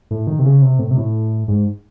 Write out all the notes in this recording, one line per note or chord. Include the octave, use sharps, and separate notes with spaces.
A2
D#3
C3
C#3
C3
A2
C3
A2
G#2